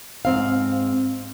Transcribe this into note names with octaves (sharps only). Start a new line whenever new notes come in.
G#2 C4 F5